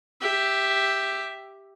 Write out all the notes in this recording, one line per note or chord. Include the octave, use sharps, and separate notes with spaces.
G4 E5